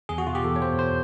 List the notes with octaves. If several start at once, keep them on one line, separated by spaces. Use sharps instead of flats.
E2 G#4
F#4
B2 F4
G4
E2 A4
C#5
B2 C5
C5